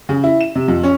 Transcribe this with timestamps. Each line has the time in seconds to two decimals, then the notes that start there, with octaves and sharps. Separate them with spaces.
0.09 C#3
0.24 E4
0.41 E7
0.55 C3
0.68 F2
0.83 C#4